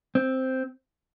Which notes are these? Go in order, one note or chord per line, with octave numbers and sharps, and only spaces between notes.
C4